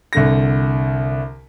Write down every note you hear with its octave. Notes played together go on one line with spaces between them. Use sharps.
C2 D3 A#6